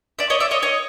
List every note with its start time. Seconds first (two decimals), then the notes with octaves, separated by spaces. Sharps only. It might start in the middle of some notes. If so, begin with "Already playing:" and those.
0.19 D5 E5
0.30 C#5 D#5
0.40 D5 E5
0.51 C#5 D#5
0.63 C#5 D#5